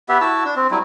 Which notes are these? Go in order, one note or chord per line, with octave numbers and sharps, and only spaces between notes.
B3 G4 E5
E4 F#4 A5 E6
D4
C4
F#3 G3 A3 E4